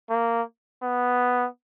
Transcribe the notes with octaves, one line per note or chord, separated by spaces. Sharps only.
A#3
B3